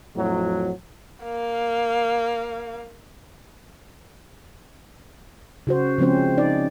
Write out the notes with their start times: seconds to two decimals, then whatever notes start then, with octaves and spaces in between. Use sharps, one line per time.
0.16 F2 A2 F#3
1.23 A#3 F5
5.67 C#3 F#4 C5
5.99 C#3 F3 G#3 C4 C#4 C5
6.37 D#4 D5